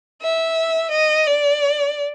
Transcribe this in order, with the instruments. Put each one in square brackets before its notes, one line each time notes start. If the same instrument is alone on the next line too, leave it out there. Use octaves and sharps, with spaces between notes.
[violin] E5
D#5
D5